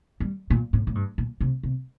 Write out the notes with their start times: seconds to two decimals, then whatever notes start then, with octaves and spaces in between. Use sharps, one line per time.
0.20 G3
0.50 A#2
0.73 A2
0.87 A2
0.95 G2
1.18 A#2
1.41 C3
1.63 C3